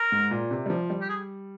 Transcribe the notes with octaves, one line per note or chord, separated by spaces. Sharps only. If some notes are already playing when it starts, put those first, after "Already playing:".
Already playing: A#4
G#2
A#2
C3
G3
F3
G3
G4
G#4